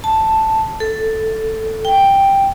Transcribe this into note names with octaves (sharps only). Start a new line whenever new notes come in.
A5
A4
G5